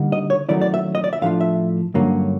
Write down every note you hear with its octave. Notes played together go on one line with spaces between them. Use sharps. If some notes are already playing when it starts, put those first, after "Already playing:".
Already playing: D3 G3 A#3 D#4
D#5
C#5
D#3 F#3 A3 C#4 E4 D5
D5
E5
D#5
D5
E5
A2 F3 A3 D4 F4 F5
E5
G2 D3 F#3 A#3 C#4